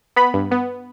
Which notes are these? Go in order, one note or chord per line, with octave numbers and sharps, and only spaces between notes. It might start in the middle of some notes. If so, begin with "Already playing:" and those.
B3 B5
G2
B3